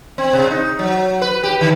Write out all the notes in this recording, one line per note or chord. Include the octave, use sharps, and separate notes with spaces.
C4
C3
D#4
F#3
B4
G4
D#3